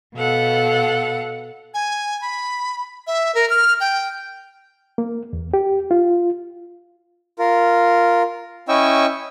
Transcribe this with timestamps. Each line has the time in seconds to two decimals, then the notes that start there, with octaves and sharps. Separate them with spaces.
0.16 B2 A4 F5 F#5
1.74 G#5
2.22 B5
3.07 E5
3.35 A#4
3.50 F6
3.80 G5
4.98 A#3
5.33 E2
5.54 G4
5.91 F4
7.39 F4 A#4
8.69 C#4 E4 D#5 G5 C#6 E6